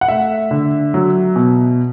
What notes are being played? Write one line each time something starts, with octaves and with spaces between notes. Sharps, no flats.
F#5
A3 E5
D3
F#3
B2